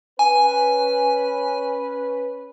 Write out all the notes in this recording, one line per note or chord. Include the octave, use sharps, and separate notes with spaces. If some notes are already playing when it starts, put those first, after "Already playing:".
C#4 B4 G#5